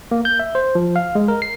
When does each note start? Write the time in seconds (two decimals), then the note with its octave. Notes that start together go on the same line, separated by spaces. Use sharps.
0.11 A#3
0.25 G6
0.39 E5
0.55 C5
0.75 F3
0.96 F5
1.15 G#3
1.28 A#4
1.42 C7